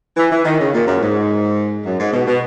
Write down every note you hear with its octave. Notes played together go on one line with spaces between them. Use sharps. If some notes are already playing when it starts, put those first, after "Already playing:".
E3
E3
D#3
C#3
A#2
F#2
G#2
F#2
G#2
B2
B2